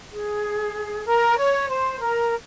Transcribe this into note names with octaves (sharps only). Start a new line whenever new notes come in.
G#4
A#4
C#5
C5
A#4